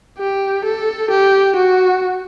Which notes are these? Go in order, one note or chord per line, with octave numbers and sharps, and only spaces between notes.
G4
A4
G4
F#4